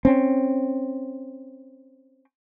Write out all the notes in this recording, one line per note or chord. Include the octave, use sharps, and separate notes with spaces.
C4 C#4